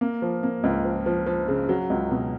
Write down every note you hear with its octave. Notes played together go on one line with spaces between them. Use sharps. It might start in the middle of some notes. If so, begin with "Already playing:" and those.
A#3
F3
A#3
C#2
F3
F3
F3
C#3
F#3
C#2
B2